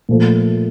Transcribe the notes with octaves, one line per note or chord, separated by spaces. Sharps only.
A#2 F3 A3